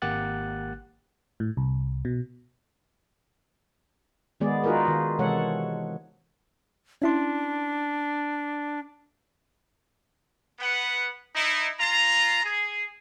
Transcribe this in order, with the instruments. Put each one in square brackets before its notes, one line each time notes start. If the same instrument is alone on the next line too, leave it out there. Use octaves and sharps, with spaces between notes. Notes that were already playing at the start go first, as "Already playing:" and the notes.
[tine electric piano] G#1 A#3 G4 F#5 F#6 A6
[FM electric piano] A2
C2
B2
[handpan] D#3 G#3 B3 G#4 D5
D#4 F4 F#4 G#4 A#4 B4
D#3
C3 E3 G#3 A4 C#5 F#5
[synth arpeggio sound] C#4 E4 C6 [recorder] D4
[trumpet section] B3 B4 F#5
D#4 E4
F4 A#5
G#4